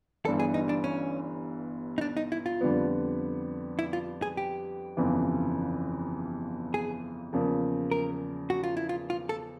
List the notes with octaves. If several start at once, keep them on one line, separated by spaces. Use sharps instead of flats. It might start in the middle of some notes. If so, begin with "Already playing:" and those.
G1 G2 E3 A4
G#4
D#4
D4
C#4
D#4
D4
D#4
E4
F4
F2 D3 G3 B3
E4
F4
G#4
G4
G1 F2 C#3 E3
G#4
E2 C#3 F3 A#3
A#4
F#4
F4
E4
F4
F4
A4